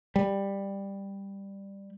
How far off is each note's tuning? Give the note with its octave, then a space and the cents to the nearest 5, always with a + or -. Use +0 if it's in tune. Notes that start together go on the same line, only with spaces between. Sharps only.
G3 +10